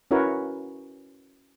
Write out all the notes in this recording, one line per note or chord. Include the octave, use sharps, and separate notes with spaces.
C#4 E4 F#4 A#4 B4 C#5